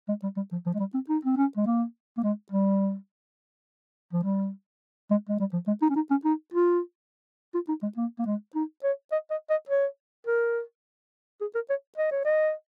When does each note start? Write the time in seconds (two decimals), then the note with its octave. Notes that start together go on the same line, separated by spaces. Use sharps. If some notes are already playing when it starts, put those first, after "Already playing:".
0.09 G#3
0.23 G3
0.36 G3
0.52 F3
0.66 F3
0.74 G#3
0.79 G3
0.94 C4
1.09 D#4
1.25 C4
1.37 C#4
1.57 G#3
1.66 A#3
2.17 A#3
2.23 G#3
2.52 G3
4.13 F3
4.24 G3
5.11 G#3
5.29 G#3
5.39 G3
5.53 F3
5.67 G#3
5.82 D#4
5.90 C#4
5.96 D#4
6.11 C#4
6.25 D#4
6.54 F4
7.54 F4
7.69 D#4
7.82 G#3
7.97 A#3
8.19 A#3
8.26 G#3
8.55 D#4
8.83 C#5
9.12 D#5
9.30 D#5
9.50 D#5
9.69 C#5
10.27 A#4
11.41 G#4
11.55 A#4
11.70 C#5
11.98 D#5
12.11 C#5
12.25 D#5